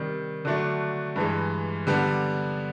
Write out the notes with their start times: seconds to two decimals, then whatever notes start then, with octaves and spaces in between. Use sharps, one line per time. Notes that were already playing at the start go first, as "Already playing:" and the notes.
Already playing: C3 D#3 G3
0.45 D3 F#3 A3 D4
1.16 G2 E3 G#3
1.87 D3 G3 B3 D4